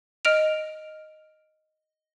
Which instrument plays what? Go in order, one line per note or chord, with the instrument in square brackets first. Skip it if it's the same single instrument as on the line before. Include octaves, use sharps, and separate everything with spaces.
[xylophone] D#5 F6 D7 F7